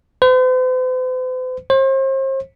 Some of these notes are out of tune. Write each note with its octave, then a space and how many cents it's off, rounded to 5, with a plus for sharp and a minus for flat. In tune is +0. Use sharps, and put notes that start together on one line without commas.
C5 -45
C5 +40